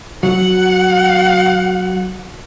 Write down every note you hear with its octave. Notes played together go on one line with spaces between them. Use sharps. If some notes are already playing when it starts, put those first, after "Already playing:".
F#3 F#4 F#5